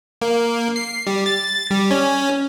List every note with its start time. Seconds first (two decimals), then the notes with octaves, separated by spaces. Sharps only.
0.22 A#3
0.76 C7
1.07 G3
1.26 A6
1.71 G3
1.91 C#4